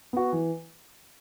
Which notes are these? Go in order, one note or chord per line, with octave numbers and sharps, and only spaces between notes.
B3 F#4
E3